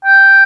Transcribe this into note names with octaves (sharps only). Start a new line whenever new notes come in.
G5